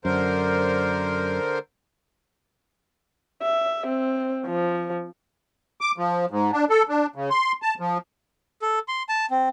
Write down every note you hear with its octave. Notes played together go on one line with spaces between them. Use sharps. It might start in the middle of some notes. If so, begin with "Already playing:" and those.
F#2 D3 A#4 C5
E5
C4
F3
D6
F3
G#2
D4
A4
D4
C#3
C6
A5
F3
A4
C6
A5
C4